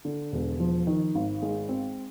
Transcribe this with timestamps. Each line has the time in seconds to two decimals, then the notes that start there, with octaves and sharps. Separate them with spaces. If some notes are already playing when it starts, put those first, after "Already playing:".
0.05 D3
0.32 E1
0.60 F3
0.87 D#3
1.15 G#1
1.42 G#3
1.69 C4